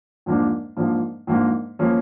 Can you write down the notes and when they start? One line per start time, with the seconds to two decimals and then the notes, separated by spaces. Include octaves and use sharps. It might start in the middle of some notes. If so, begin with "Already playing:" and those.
0.26 G#2 F3 A#3 D4
0.77 G#2 F3 A#3 D4
1.27 G#2 F3 A#3 D4
1.79 F3 A#3 C#4